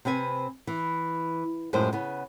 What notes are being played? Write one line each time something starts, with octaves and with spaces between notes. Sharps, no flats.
C3 C4 B4 G#5
E3
F#2 A2 F3 G#3 C5
C#3 B3